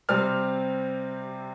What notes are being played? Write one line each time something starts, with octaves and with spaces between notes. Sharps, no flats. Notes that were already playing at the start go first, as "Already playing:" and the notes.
C3 G3 C4 F6